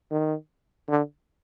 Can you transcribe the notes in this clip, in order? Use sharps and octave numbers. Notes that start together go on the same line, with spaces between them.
D#3
D3